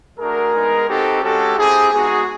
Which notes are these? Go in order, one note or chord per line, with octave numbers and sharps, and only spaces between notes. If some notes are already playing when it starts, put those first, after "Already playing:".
A3 D4 F#4 G#4 A#4
G#3 B3 D#4
C4 D#4 F#4 G4 A4
G#3 C#4 F#4 G4 A4
C4 E4 G4 G#4
G#3 B3 D#4 F#4 G#4